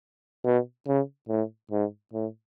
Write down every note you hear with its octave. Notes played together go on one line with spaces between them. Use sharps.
B2
C#3
A2
G#2
A2